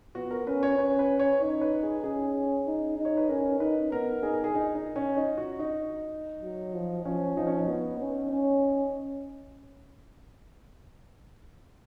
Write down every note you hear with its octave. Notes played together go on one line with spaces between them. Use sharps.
B3 F#4
A#4
C#4 B4
C#5
C#4 B4
B4
C#5
D#4 C#5
B4
G#4
C#4 G#4
D#4
D#4
C#5
B4
C#4 A#4
D#4 B4
B3 A#4
D#4 G#4
A#4
G#4
D#4
D#4
C#4
D#4
F#4
D#4
F#3
F3
F3 C#4
F3 D#4
C#4
D#4
B3
C#4
C#4